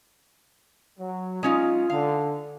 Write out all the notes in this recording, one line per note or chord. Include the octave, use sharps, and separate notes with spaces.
F#3
G#3 C#4 D#4 F4
D3 F5